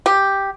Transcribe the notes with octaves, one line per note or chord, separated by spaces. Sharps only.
G4